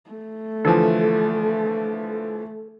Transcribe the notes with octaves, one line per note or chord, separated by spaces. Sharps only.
A3
D3 E3 F3 A4